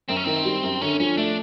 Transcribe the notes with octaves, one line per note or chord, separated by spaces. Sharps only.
F#2 C4
C#4
D#3 C4
G3
F#2
D3 C#4
F3 C#4
A3 D4